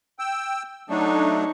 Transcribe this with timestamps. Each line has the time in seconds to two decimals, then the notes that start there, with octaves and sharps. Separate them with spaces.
0.19 G5 E6
0.90 F#3 A3 D4 D#4 C#6